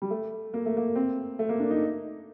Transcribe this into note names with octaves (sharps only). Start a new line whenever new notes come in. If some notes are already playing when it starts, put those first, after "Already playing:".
G3
A3
A#3
A3
A#3
C4
A3
A#3
D4
D#4